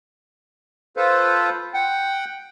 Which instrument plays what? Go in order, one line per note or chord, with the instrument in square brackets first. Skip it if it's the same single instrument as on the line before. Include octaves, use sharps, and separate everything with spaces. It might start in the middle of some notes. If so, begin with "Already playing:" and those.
[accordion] F4 A4 B4 C5
F#5 G5